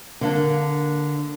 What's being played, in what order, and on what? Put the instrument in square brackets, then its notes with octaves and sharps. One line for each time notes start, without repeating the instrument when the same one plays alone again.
[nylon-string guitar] D3 A#3 D4